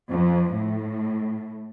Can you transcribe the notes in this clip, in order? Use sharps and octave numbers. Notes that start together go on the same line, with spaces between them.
F2
A2